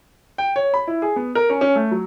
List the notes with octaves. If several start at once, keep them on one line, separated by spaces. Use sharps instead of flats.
G5
C#5
B5
E4
G#4
B3
A#4
C#4
C#4
A3
F#3